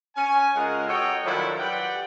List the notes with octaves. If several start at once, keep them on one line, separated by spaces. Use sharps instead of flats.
C#4 G#5
C#3 G#3 F4 G#4 A#4 F#5
F#4 A4 C#5 D#5 G5
D#3 F#3 G3 E4 F4 A4
G4 B4 D5 F#5 G5